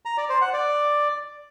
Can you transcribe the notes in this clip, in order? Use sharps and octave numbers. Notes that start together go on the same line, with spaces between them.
A#5
D5
C5
F#5
D5